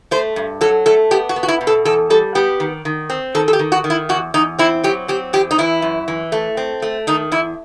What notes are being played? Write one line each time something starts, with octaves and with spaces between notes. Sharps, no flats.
A3 C5
G2
F#3 A4
A3 A4
B3 G4
F#4
B3
F#4
E4
B2
A4
E2 A4
G3 A4
B3 G4
D#3
D#3
C4
D#3 A4
A4
G4
D#3
F#4
D#3
E4
E2 F#4
E2 D#4
C4 E4
F#3 G4
C4 G4
E2 G4
D#4
E3 E4
F#2
E3
A3
C4
A3
D#3 D#4
E2 E4